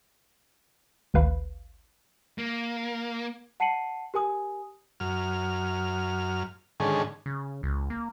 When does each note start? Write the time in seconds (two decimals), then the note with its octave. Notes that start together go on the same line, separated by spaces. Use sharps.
1.14 G#1 D2 B4 F5 B5
2.38 A#3
3.60 F#5 A5 C7 C#7 D#7 F#7
4.14 G4 A#4 G#5 D#6
5.00 F#2 F6
6.80 G#2 D3 D#3 C#4 G#4 A4
7.26 C#3
7.63 C#2
7.90 A#3